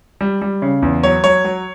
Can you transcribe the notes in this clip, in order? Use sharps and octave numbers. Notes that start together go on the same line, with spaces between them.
G3
G3
C#3
E2
F#3 C#5
F#3 C#5
F#3